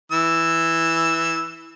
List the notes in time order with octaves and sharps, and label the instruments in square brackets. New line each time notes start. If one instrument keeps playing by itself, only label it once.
[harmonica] E3 E6